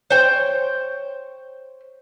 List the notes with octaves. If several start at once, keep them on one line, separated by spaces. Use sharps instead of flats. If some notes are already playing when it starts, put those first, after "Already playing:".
C5 C#5 G5